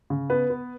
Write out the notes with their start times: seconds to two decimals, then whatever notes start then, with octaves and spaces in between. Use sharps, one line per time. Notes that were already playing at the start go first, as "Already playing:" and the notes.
0.10 C#3
0.30 B3 B4
0.50 B3